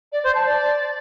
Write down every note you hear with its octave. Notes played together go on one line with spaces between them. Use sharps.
D5
C5
A5
D5